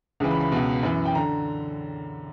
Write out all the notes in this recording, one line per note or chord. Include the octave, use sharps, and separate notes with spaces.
C#2 C#3 E3
B5
B5
C#2 B2
F#2 E3
G5
D3 A#5